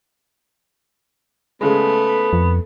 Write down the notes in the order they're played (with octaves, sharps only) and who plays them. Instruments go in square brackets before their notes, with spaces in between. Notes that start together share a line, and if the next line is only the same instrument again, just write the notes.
[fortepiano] C#3 G#3 [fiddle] A3 [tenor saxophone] B3
[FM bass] F2